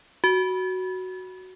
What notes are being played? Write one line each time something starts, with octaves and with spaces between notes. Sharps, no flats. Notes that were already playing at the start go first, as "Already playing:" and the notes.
F#4